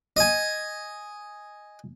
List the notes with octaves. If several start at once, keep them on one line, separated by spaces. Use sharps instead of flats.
D#5 G#5